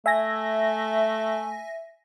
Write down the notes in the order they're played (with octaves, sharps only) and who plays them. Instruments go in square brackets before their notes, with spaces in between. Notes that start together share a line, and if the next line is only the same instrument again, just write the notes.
[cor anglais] A3 [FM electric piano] E5 G#5 A#6